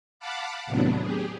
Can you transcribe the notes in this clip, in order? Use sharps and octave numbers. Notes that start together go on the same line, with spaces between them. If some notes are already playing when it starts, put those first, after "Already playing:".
F5 F#5 A5 B5 D6
D#2 A2 C3 F#3 B3 D4
G4 G#4